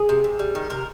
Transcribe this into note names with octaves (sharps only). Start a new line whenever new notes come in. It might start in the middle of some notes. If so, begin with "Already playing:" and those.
Already playing: G#4
C3
C3
G3
D#3
C3 A#4